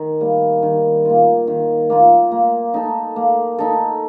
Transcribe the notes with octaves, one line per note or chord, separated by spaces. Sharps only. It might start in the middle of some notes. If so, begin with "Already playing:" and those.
Already playing: D#3
G3 A#3
D#3
A#3 F4
D#3
A#3 F4
A#3
D#4 A4
A#3
D#4 A4